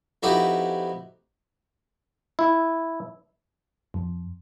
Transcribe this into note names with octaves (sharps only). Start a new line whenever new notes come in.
F2 D#4 E4 F#4 G4 B4
E4
F2